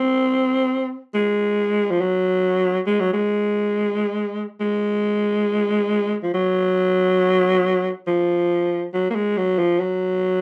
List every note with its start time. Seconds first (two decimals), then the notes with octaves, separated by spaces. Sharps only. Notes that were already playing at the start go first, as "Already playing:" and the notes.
Already playing: C4
1.14 G#3
1.90 F3
2.01 F#3
2.87 G#3
3.00 F#3
3.13 G#3
4.60 G#3
6.23 F3
6.34 F#3
8.07 F3
8.94 F#3
9.10 A#3
9.15 G#3
9.37 F#3
9.58 F3
9.80 F#3